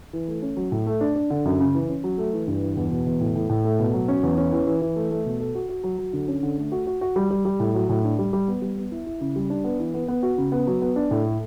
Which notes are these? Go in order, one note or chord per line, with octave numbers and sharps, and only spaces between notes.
E3
A3
C#4
F#3
A2
A3
D4
D4
D3
F#2
C#3
E3
C#4
F#3
A3
E3
G2
E3
E2
B2
E2
A2
A2
A2
A3
B2
F#3
C#4
E2
C#4
E3
E3
E3
A3
A3
B2
A4
F#4
F#4
F#3
F#3
D3
C#4
D3
A3
F#4
F#4
F#4
G3
G3
G3
A2
F#3
A2
D4
G3
G3
B3
G3
B3
E4
E4
C#3
G3
D4
B3
E3
B3
B3
F#4
C#3
B3
F#3
B3
D4
A2
A3